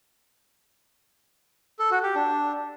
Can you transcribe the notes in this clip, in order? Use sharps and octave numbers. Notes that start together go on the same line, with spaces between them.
A4
F#4
G4
D4